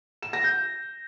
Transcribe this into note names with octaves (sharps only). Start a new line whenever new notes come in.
E7
A#6
G6